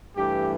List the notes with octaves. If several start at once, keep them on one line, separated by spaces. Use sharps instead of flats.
G2 E3 A3 G4